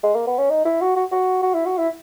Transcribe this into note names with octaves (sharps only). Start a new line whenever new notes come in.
G#3
A#3
B3
C#4
D#4
E4
F#4
F#4
F#4
F#4
E4
F#4
E4